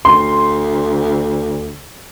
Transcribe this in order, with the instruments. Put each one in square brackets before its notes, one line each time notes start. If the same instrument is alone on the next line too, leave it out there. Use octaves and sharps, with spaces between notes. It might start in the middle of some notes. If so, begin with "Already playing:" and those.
[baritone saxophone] D2 [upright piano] C6